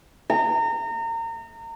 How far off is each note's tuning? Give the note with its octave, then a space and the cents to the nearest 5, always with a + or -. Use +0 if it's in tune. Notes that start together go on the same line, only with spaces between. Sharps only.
A#5 -30